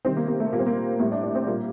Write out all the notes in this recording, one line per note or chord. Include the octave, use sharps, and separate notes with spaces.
C3 D#3 G3 C4
A#3
A#3
A3
A#2 G3 A#3 C4
A#3
A2 G3 A#3
D4
D4
C4
A#2 G3 A#3